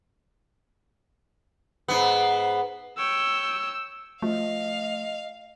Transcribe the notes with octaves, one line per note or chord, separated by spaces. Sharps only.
G#2 B3
C#5 G5 E6
F3 A3 D#5 F5